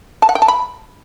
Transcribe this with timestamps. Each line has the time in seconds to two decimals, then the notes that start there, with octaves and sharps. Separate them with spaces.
0.22 A5
0.29 F#5
0.35 G5
0.42 A5
0.48 B5